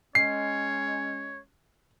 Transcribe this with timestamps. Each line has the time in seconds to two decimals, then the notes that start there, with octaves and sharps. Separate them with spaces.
0.15 G#3 C#4 C#5 C7